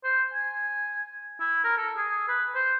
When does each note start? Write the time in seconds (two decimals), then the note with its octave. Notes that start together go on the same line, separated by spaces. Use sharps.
0.04 C5
0.33 G#5
1.40 E4
1.64 A#4
1.78 A4
1.97 G#4
2.28 B4
2.55 C5